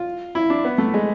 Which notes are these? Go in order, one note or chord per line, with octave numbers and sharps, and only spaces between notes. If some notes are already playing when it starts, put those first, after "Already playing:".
Already playing: F4
E4
D4
B3
A3
G#3